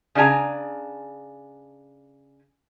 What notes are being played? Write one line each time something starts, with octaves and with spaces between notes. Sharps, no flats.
C#3 D4 F4 G#5 A#5